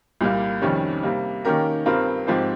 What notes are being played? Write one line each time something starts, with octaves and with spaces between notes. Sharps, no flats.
C2 A#2 G3 A#3
F2 C3 D#3 G3 C#4
C3 G3 A#3
D#3 A#3 C#4 G4 A#4
G2 G3 C4 F4 A#4
G#2 F3 C4 G4 C5